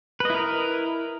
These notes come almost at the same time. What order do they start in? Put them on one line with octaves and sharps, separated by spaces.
B4 D#5 E4 A#4